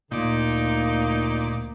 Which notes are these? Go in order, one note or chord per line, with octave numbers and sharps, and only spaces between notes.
D2 A#2 A#3 D#4 D6